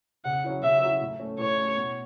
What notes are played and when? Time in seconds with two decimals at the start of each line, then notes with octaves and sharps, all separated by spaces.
0.25 C#3 F#5
0.44 F#3 C#4 E4
0.63 C#3 E5
0.82 F#3 C#4 E4
1.01 A2
1.19 A3 C#4
1.38 A2 C#5
1.58 A3 C#4
1.76 B2